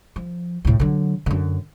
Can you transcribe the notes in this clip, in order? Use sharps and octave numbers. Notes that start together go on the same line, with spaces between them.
F3
D2 A2
D3 F#3
F#2 D3